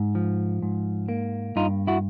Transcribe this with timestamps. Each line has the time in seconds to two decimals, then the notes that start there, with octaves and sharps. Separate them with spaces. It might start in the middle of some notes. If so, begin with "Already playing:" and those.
Already playing: G#2
0.15 F3
0.62 G#2
1.09 A#3
1.56 G2 D#4 F4
1.87 E4 F#4